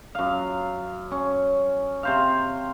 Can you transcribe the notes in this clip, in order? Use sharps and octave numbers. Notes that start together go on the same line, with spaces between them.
F#2 F5
C#4
C3 C5 F5